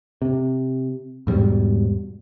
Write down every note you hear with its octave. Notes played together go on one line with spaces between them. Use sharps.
C3
E2 G#2 B2 G3